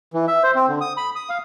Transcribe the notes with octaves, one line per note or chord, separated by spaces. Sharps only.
E3
E5
C5
C4
D3
D#6
B5
D#6
F5